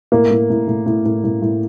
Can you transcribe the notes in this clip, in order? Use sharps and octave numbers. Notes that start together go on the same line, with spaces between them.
A2 A#3
A2
A2
A2
A2
A2
A2
A2